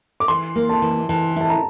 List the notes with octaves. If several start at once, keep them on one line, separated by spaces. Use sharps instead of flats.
D6
E3 C6
A#3
A5
E3
E3 A5
E4 A5
A#5